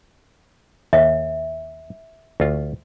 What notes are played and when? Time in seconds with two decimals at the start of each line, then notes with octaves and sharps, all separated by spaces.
0.93 D#2 E5
2.40 D2 F4